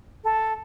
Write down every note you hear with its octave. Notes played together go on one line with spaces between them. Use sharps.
A4